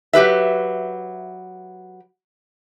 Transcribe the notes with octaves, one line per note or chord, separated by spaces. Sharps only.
F#3 G4 B4 E5